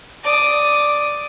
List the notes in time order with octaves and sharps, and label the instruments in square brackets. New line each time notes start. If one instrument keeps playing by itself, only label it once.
[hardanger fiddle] D5 D#6